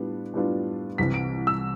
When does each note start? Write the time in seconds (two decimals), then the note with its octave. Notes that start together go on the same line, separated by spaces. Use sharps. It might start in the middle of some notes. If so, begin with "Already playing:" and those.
Already playing: A2 G3 B3 D4 F4
0.34 A2 G3 B3 D4 F4
0.98 C2 C3 E3 G3 B6
1.14 D7
1.47 E6